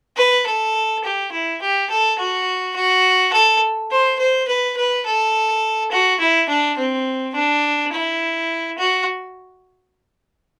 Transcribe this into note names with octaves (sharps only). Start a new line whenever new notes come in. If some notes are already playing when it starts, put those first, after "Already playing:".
B4
A4
G4
E4
G4
A4
F#4
F#4
A4
C5
C5
B4
B4
A4
F#4
E4
D4
C4
D4
E4
F#4